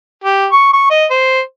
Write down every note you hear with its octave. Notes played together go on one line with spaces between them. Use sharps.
G4
C#6
C#6
D#5
C5